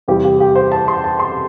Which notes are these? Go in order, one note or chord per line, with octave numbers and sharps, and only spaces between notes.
E2 C3 G3 G4
G4
G4
C5
A5
C6
A5
C6